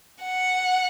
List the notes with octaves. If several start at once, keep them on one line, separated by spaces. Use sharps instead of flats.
F#5